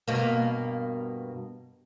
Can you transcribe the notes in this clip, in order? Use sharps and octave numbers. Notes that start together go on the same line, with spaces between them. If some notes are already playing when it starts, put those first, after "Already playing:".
G2 B2 A#3